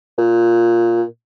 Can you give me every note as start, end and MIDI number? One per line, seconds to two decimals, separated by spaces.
0.18 1.02 46